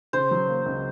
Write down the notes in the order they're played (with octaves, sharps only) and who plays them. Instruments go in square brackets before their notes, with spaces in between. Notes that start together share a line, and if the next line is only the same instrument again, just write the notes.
[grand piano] C#3 [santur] C5
[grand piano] F#3
A#3
C#2